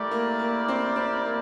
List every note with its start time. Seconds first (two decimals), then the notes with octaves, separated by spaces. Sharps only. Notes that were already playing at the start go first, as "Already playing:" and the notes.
Already playing: A3 E4 G4 A#4 D5
0.11 A#3
0.39 A#3
0.68 C4
0.96 C4
1.25 A#3